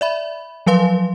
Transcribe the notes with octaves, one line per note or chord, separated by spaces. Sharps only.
D5 E5 B5
F3 F#3 B4 F5 C6